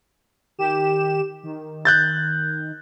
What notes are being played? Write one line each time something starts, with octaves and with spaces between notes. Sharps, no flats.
D#3 G4 E7
D#3
F#6 G6 A6